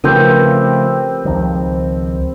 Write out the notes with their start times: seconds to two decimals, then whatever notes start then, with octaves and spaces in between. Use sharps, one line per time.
0.04 C#3 F3 A3 C4 G4 A#4 B4 G6
1.25 C#2 D#3 F3